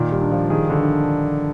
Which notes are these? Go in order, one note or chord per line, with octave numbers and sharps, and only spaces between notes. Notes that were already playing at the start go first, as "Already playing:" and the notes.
Already playing: A#2 D#3
G3
D4
F3
D#3 G#4
D3
D4